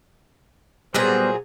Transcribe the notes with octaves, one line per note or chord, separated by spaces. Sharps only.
A#2 F#3 G3 B3 G#4 C5